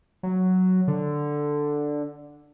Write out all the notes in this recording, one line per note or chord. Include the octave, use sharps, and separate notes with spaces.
F#3
D3